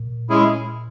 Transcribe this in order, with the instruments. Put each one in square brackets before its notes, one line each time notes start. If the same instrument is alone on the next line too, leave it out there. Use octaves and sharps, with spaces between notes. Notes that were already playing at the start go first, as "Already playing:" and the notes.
Already playing: [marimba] A#2
[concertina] G#3 C#4 E4 G#4